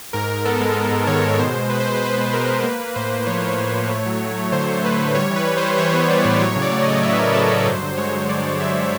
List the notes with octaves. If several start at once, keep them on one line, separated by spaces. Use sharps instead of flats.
G#2 A#4
G#2
B3 A4
G#3
B3
G#2
D#3 C#5
G#3
B2 C5
B2
G#3 B4
C5
B2 B4
B2 B4
B3
B3 A#4
B2
A#3 B4
A#3
A2 C5
A#3
F3 C#5
A2
A2
A2
A3
F#3
F#3
A3
D3 C5
A3
A3 B4
D3
G3 C#5
E3
B4
G3
C5
G3
E3 C#5
B3
B3 D5
A2
F#3 C#5
C#3
D5
A3
D#5
F#3
F#3 E5
B4
F#3 A#4
F#3 A4
F#3 A#4
G2 C5
D3
G#3 C#5
D3
D3 D5
D3
G#3 E5
G#3